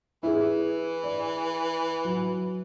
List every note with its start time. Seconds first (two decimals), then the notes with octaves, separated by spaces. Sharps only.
0.23 E3 E4 G#4
1.04 D5
2.05 F#3